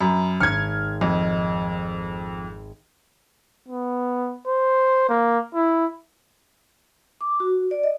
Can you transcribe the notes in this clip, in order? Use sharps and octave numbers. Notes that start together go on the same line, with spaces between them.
F#2 B5
G#1 F6 G#6 C#7
F2 D#5
B3
C5
A#3
E4
D6
F#4
D5
D#5